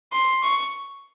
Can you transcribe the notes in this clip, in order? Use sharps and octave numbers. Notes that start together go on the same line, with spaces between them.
C6
C#6